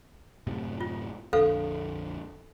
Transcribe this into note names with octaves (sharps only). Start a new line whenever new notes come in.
F#2 A2 C3
F4
A#1 F2 D3 A4 B4 F5